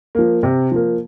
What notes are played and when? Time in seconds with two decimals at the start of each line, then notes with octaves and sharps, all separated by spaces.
0.15 F3 A#3
0.43 C3
0.71 F3 A#3